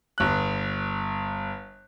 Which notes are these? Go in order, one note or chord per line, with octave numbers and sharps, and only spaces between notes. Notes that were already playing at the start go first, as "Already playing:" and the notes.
G1 F#6